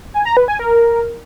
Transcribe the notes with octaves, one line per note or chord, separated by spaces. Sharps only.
G#5
A#5
B4
G#5
A#4